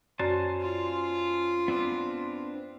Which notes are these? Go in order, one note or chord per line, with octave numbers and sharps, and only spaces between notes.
F#2 C#4 F#4 C5 D5 A5
F4
B3 C4 D4